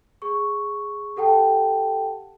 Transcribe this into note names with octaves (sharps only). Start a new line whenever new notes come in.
G#4 C#6
G4 A4 F#5 G5 A5